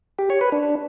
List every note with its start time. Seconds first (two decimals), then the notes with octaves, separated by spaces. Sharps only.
0.19 G4
0.30 C#5
0.41 B4
0.52 D4